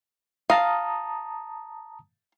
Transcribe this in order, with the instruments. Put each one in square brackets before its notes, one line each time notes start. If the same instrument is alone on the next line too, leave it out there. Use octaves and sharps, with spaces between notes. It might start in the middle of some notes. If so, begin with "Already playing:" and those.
[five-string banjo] F5 [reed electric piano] A5 A#5 D#6